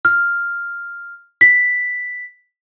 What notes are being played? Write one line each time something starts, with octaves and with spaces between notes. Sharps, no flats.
F6
B6